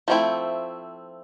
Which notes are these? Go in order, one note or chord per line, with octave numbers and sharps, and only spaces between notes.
F3 A3 C4 E4